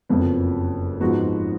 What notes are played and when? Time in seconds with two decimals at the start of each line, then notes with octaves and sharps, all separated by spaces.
0.09 F#1 F2 F3 B3
1.00 G#2 F3 B3 F#4